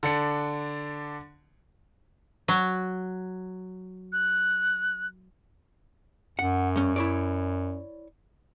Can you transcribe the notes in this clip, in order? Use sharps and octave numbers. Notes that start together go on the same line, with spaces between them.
D3 D4 C#7
F#3
F#6
F#2 F#5
G2 C#4
E4 C#5 D5